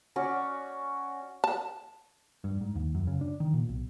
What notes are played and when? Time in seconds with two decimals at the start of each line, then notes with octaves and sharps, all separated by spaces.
0.16 C#4 F#4 C#5 D5
1.44 A5
2.44 G2
2.61 G#2
2.75 D#2
2.95 F#2
3.07 C#3
3.21 D4
3.40 D#3
3.54 A#2
3.69 B1